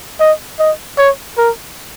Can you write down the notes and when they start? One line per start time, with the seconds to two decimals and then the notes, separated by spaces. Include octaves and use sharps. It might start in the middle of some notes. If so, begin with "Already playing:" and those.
0.20 D#5
0.59 D#5
0.98 C#5
1.38 A#4